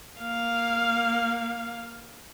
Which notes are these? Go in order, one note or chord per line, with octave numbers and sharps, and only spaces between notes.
A#3 F5